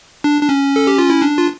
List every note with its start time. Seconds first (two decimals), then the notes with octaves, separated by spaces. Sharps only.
0.24 D4
0.42 D4
0.49 C#4
0.76 A4
0.87 G4
0.98 F4
1.10 E4
1.22 D4
1.38 F4